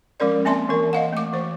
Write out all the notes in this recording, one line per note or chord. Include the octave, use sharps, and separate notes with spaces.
F3 G#3 C#4 A#4 D5
A#3 C4 E5 A5 C6
E3 A#4
D#5 F5 F#5
A3 D6
E3 C5